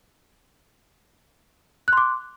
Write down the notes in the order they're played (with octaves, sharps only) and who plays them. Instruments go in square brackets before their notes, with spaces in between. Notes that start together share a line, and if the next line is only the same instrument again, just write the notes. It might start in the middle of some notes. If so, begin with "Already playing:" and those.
[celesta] F#6
C6
D6